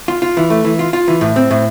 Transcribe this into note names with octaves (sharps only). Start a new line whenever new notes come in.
F4
F4
E3
A3
E3
F4
F4
E3
A2
C4
A2